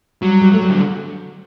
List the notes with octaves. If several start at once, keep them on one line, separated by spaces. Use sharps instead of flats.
F#3 G3
G3
F#3 A3
G3
D3